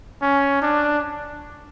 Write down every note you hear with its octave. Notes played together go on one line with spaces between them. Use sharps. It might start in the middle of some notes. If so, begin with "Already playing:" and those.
C#4
D4